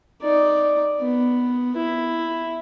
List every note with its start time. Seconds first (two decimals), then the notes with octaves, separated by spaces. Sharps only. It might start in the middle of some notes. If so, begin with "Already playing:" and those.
0.23 D#4 D5
1.02 B3
1.76 E4